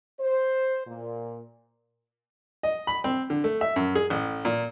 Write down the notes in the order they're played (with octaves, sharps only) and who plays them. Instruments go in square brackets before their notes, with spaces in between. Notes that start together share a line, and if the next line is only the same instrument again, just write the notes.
[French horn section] C5
A#2
[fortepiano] D#5
B5
C4
D3
A3
E5
F#2
G#4
A1
A#2